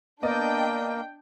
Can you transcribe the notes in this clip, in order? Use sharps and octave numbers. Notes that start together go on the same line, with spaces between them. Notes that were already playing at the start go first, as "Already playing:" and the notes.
A#3 B3 D4 D5 D#5 G5